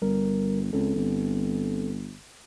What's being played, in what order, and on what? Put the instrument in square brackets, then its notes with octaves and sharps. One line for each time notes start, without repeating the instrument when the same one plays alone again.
[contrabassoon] G1 [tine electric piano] G3 A#4
[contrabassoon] C#2 [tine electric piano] C4 A4
[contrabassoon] G1